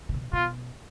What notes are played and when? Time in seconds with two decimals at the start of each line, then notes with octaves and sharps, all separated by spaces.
0.09 C3
0.14 B2
0.33 B2 F4